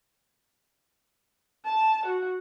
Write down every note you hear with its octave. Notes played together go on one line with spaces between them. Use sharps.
A5
F#4